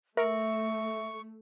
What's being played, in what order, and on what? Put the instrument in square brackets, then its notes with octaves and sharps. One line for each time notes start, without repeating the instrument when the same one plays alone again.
[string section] A3 [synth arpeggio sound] A#4 [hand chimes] E5 [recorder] C#6